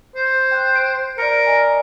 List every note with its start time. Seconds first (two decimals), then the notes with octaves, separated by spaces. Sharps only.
0.15 C5
0.51 G5 F#6 G6
0.76 D7
1.18 A#4 D5 A#5 C#7
1.47 D5 D#5 G#5